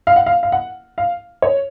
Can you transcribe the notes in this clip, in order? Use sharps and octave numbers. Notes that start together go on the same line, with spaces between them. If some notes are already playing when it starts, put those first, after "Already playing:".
F5
F#5
F5
F5
F#5
F5
C#5